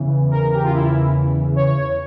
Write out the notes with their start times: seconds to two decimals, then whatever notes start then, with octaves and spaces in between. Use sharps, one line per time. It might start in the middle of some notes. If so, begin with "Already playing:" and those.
Already playing: E2 C#3 E3
0.31 A#4
0.54 G4
0.64 F4
0.72 E4
1.56 C#5